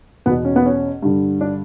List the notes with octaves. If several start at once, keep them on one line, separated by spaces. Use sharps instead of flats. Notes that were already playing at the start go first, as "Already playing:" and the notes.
E2 B2 B3
C#4
B3
C#4
G2 D3
D4